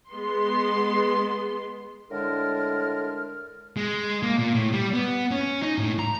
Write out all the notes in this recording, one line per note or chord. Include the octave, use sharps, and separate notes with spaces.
G#3 B3 C6
A2 D3 G#3 D4 A#4 F6
G#3
A#3
A#2
A2
G3
B3
C#4
D#4
A2
A#5